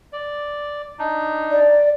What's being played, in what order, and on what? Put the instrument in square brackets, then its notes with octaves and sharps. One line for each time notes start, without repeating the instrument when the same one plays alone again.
[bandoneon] D5
D4 D#4
[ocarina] D5